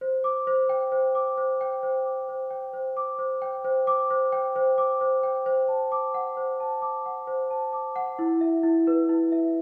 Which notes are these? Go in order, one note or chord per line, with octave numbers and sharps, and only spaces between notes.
C5
D6
C5
G5
C5
D6
C5
G5
C5
D6
C5
G5
C5
D6
C5
G5
C5
D6
C5
G5
C5
D6
C5
G5
C5
A5
D6
F#5
C5
A5
D6
F#5
C5
A5
D6
F#5
E4
E5
E4
B4
E4
E5